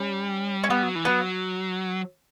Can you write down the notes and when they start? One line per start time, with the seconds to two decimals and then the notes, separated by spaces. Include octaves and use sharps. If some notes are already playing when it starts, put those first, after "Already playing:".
Already playing: G3 C#4
0.64 C#4
0.70 G3 B3
0.83 F#3
0.95 E3
1.05 F#3 B3